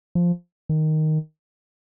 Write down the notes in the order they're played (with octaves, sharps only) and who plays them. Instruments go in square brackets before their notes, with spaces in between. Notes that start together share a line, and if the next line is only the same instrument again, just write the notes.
[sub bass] F3
D#3